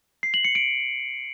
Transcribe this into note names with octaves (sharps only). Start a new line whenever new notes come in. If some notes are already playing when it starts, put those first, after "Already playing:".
C7
F#7
C#7
D7